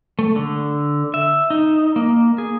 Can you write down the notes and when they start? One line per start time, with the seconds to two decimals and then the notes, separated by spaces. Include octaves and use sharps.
0.19 A3
0.36 D3
1.14 E5
1.50 D#4
1.96 A#3
2.38 G#4